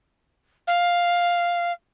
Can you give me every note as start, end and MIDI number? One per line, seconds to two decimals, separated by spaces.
0.67 1.72 77